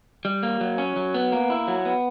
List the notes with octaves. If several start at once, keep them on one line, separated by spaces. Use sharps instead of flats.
G3
A#3
F#3
C#4
F#3
B3
A#3
E4
F#3
B3